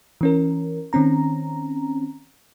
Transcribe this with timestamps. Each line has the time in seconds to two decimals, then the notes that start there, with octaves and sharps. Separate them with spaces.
0.21 E3 C#4 A#4
0.93 D#3 C4 C#4 A#5